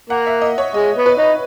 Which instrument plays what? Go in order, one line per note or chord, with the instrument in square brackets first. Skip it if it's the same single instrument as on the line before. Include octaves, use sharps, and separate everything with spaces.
[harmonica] A#3 [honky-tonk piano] F#5
[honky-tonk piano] E5
D#5
C#5
[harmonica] G#3 [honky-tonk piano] D#5
[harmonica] B3
[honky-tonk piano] B4
[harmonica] D#4